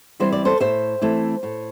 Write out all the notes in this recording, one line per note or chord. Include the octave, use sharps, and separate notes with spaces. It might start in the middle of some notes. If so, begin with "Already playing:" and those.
E3 G3 C4 E4 C5
D5
A4 C5
A2 C5 E5
E3 A3 C4 E4
A2